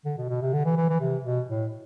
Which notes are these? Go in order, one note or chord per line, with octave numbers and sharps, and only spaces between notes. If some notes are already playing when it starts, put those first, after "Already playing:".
D3
B2
B2
C3
D3
E3
E3
E3
C3
B2
A2